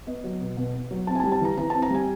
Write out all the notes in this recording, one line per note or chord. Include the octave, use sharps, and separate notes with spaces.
B3 D#5
F#3
B2
B2
B3
F#3
C4 A5
G#5
A5
G3
A5
E3 A#5
E3 A#5
C4 A5
A#5
G3 G#5